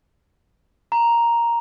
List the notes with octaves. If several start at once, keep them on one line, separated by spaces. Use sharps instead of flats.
A#5